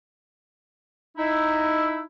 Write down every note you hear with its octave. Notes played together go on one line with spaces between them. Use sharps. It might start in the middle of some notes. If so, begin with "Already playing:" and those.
D#4 E4